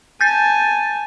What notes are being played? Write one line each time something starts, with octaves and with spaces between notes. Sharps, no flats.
G#5 A5 G6 A6